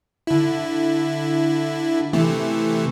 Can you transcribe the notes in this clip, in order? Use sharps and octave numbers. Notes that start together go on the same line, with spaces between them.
D3 E4
C3 E3 A3